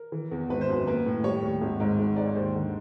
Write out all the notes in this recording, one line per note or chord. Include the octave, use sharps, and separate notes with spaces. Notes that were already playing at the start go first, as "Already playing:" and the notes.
Already playing: A#4
E3
E2
G#1 B4
C5
F#2 B4
A#3 B4
A2
G3 C#5
D#2
G#1
G#2
G#1
G#2 D5
C#5
D#2 C5
D3